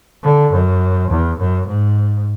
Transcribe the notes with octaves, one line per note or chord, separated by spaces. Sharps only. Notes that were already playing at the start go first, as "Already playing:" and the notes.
D3
F#2
E2
F#2
G#2